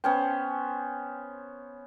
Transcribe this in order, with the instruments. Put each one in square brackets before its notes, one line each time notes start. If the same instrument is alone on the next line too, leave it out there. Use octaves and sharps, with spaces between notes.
[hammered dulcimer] B3 C#4 C5 [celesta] G5